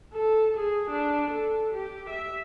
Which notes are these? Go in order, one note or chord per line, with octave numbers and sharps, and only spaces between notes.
A4
G#4
D4
A4
G4
E5